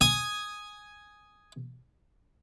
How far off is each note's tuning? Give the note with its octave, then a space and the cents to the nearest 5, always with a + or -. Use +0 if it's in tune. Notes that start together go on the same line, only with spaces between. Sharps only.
G#5 +0 D#6 +0